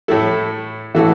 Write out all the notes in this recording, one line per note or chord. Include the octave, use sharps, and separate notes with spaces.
A2 A3 E4 A4
A2 E3 A3 F#4 A4